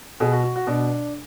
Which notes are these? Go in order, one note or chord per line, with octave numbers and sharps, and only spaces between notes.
B2 G#4
F#4
F#4
F#4
B2 D4